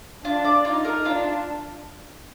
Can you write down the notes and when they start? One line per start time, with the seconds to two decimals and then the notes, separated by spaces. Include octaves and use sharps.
0.24 D4 F4
0.45 D5
0.65 D#4 F4
0.85 A#4
1.05 D4 F4